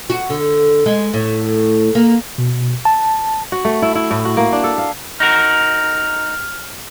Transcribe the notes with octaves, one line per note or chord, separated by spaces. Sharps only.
F#4
D3
G#3
A2
A#3
B2
A5
F#4
A3
E4
E4
A2
F#4
A#3
D4
A4
F5
D#4 F#4 A#4 F6